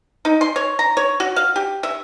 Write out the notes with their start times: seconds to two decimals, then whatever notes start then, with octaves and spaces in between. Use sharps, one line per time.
0.25 D#4
0.41 C6
0.56 C#5
0.79 A#5
0.97 C#5
1.20 F#4
1.36 F5
1.56 G4
1.83 E5